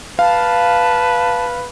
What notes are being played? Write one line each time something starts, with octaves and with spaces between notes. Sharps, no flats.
B4 F5 A5